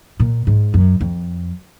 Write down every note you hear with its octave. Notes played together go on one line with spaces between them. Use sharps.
A#2
G#2
F#2
F2